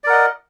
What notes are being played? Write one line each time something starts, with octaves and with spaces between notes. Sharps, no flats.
A#4 D5 D#5 F#5